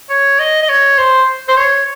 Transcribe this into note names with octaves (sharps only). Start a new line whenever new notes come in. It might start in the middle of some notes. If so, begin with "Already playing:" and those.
C#5
D#5
D#5
C#5
C5
C5
C#5